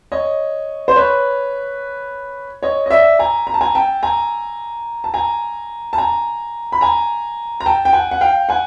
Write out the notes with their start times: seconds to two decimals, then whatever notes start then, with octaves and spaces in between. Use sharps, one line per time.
0.12 C#5 D#5
0.88 C5
0.96 B4 C#5
2.63 C#5 D#5
2.86 D#5
2.90 D5 E5
3.19 G#5 A#5
3.47 A#5
3.54 A5
3.61 G#5 A#5
3.75 G5 A5
4.03 G#5 A#5
5.04 A5
5.14 G#5 A#5
5.93 A5
5.98 G#5 A#5
6.72 B5
6.81 G#5 A#5
7.60 A#5
7.66 G5 A5
7.85 G5
7.93 F#5 G#5
8.11 F#5
8.21 F5 G5
8.49 F#5 G#5